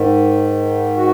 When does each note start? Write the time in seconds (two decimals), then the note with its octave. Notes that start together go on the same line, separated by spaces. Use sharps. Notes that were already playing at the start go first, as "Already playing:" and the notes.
Already playing: G#2 D#3
0.97 F#4